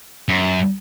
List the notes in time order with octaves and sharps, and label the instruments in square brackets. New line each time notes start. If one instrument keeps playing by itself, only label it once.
[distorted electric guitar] F#2